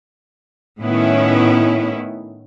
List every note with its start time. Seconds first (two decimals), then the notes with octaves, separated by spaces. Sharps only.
0.80 A2 D#3 B3 C#4 E4